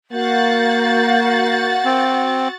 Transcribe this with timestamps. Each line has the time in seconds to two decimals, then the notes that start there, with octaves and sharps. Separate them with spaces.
0.13 A#3 F#4 A#4 F5 F#5 G6 A6
1.85 C4